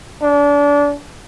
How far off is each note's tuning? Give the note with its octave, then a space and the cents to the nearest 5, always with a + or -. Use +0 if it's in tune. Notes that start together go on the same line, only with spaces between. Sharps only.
D4 -30